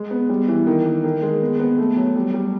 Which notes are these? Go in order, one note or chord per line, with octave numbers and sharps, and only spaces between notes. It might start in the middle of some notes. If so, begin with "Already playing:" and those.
Already playing: G#3
B3
G3
E3
D#3
A#3
D#3
G#3
B3
B3
A3
F#3
G3
G3